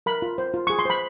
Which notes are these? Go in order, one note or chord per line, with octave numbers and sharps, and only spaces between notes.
A#4 B5
F4
C5
F4
G#4 C#6
C6
C5 B5